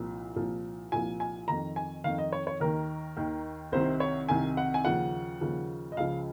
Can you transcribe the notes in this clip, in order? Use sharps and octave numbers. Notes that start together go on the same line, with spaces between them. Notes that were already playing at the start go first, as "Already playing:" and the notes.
Already playing: C2 A#2 F3
C2 A#2 F3
C2 A#2 F3 G#5
G#5
F2 D#3 A#5
G#5
F2 D#3 F5
D#5
C#5
C#5
D#2 D#3 A#4
D#2 D#3
C2 C3 D#3 C5
C#5
C2 C3 D#3 G#5
F#5
G#5
D#2 C#3 F3 F#5
D#2 C#3 F3
D#5
C#2 C#3 F3 F5